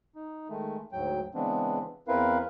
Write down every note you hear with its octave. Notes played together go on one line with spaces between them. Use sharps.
D#4
D#3 G#3 A3
D2 G#2 F#3 G5
C#3 E3 G#3 B3 C4 D4
E2 C4 E4 A#4 B4 F5